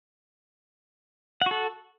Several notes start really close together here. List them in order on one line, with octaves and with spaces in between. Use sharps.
F#5 F#4 A4